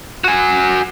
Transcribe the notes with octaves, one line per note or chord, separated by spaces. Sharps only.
F#4 G#5